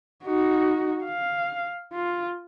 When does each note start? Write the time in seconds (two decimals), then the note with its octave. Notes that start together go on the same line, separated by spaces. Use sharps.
0.24 D#4 F#4
1.04 F5
1.93 F4